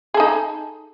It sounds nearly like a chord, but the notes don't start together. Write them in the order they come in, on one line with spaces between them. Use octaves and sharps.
G#4 A4 D#4